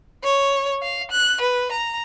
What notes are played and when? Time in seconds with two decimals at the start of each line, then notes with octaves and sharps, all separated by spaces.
0.23 C#5
0.83 F5
1.11 F#6
1.41 B4
1.72 A#5